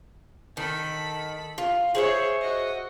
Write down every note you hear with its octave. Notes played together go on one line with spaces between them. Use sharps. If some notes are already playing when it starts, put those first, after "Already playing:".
D#3 A4 B5
F4
G#4 C5 C#5 E5
F#4 D#5